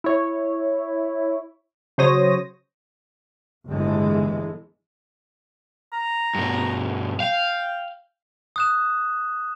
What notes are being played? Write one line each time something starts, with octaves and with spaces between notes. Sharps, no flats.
E4 C#5
C#3 F#3 C5 C#5 D#6 A#6
G1 D#2 A2 D3 E3 G#3
A#5
G2 B2
F5 G5
D#6 F#6 E7